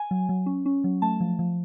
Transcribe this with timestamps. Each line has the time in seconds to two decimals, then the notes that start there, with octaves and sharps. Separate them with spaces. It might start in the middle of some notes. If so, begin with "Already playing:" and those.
Already playing: G#5
0.11 F#3
0.29 F#3
0.46 C#4
0.66 C#4
0.84 F#3
1.02 A3 A5
1.20 F3
1.39 F3